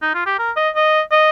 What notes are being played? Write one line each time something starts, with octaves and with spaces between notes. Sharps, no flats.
D#4
F4
G4
A#4
D#5
D#5
D#5